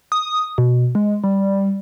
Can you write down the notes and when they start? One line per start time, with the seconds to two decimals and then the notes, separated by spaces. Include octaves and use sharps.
0.12 D#6
0.58 B2
0.95 G#3
1.24 G3